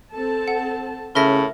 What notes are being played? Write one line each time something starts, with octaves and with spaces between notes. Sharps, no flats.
C4 A4 A5
F#5
A2 C#3 A#4 E5 A#6